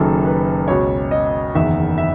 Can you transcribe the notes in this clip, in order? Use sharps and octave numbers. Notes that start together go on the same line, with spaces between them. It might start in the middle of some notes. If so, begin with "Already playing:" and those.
Already playing: F#1 F#2 D#3 A4
B4
C#2 B2 C#5
D#5
F#1 E2 D#3 E5
E5